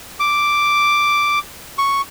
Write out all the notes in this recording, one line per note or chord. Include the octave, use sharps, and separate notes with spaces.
D6
C#6